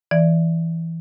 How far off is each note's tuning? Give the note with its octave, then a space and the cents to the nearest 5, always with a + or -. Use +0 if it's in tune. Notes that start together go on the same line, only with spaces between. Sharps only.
E3 +0 D5 +0